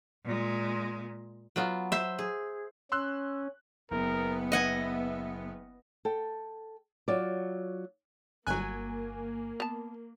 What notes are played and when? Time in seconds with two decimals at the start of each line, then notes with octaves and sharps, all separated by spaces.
0.24 A#2 G#3
1.56 F#3 B3 F4
1.92 C5 E5
2.19 G#4
2.92 C#4 C6 E6 F#6
3.91 F#1 B3 A#4
4.52 D#5 E5 F#5 G#5
6.05 A4 G5
7.08 F#3 F4 C#5 D5
8.47 G1 F#3 A#3 G#5 F#6
9.60 B3 A5